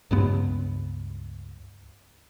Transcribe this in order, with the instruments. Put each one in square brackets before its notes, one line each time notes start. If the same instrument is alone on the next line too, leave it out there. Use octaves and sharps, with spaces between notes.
[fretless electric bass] C#2 G2 B3